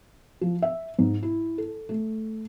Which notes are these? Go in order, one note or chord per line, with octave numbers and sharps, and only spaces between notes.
F3
E5
G#2
E4
A4
A3